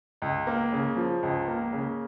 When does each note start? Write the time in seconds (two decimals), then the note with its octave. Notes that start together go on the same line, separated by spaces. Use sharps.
0.22 C#2
0.47 A#3
0.72 C#3
0.97 F3
1.23 C#2
1.48 A#3
1.73 C#3